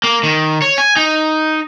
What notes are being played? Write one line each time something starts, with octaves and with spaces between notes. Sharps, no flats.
A#3
D#3
C#5
G#5
D#4